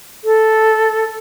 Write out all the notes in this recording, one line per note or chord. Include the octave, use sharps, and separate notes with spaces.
A4